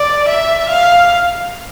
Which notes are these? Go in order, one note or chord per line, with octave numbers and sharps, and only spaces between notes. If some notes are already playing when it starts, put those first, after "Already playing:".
Already playing: D5
E5
F5